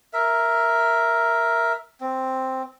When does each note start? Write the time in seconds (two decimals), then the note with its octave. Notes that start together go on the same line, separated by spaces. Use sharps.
0.13 A#4 E5
2.01 C4